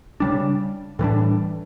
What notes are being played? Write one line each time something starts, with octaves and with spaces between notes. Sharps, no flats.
C#3 G3 D4
A2 E3 G3 D4